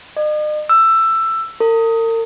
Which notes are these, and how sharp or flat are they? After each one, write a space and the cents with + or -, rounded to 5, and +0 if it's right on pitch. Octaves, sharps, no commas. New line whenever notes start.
D#5 -45
E6 +10
A#4 -40